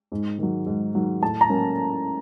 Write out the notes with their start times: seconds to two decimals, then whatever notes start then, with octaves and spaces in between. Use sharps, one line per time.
0.12 G#2
0.39 D#3 F#3
0.66 G#2
0.95 D#3 F#3
1.22 A2 A5
1.41 A#5
1.49 F#3 A#3 C#4